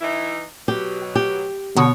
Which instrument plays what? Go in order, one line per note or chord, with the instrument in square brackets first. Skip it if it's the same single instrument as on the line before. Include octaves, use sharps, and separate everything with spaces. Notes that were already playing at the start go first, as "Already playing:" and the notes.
[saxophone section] E3 D#4 E4
[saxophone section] B2 F#3 [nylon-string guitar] G4
[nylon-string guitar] G4
[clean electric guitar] B2 [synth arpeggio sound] D3 F#4 [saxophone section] C#5